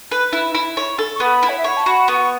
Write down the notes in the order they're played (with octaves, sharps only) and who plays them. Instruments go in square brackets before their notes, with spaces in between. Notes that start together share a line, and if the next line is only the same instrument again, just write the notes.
[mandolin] B4
E4
E4
C#5
A4
[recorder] C#6
[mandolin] B3 [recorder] B5
[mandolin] E4
[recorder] C#5
E5
[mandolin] C#5 [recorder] F#5
[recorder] A5
[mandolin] F#4 [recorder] B5
[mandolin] B3 [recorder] C#6